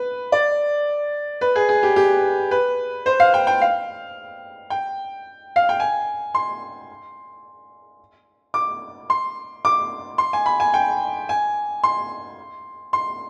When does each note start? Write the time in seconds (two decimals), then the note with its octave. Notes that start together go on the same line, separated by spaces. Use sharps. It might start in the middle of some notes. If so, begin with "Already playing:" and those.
Already playing: B4
0.32 D5
1.41 B4
1.56 G#4
1.69 G#4
1.83 G4
1.96 G4
2.51 B4
3.06 C5
3.20 F5
3.34 G5
3.47 G5
3.62 F5
4.70 G5
5.56 F5
5.69 G5
5.80 G#5
6.35 C6
8.54 D6
9.10 C6
9.65 D6
10.18 C6
10.33 G#5
10.46 B5
10.60 G#5
10.74 G5
11.29 G#5
11.83 C6
12.93 C6